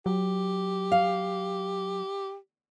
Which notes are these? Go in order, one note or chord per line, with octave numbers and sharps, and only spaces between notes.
F#3 G4
F5